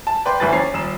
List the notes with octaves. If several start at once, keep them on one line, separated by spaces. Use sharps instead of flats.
A5
B4 D5 G5 C6
F#1 D2 E4 G4 B4 A6
E2 C#4 C7
D#1 E7